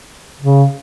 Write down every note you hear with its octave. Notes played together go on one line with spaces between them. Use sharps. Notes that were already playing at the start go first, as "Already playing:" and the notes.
C#3